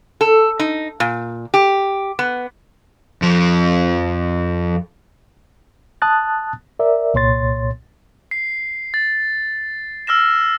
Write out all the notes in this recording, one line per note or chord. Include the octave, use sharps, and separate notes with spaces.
A4
D#4
A#2
G4
B3
F2 F3
A5 D#6 F#6 A6
A#4 D5 E5
C2 A#2 C#5 C6 A6
C7
A6
E6 F6 A#6 E7